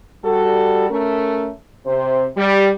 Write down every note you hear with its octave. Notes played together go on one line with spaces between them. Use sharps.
G3 F#4 A4
A3 C#4 A#4
C3 C5
G3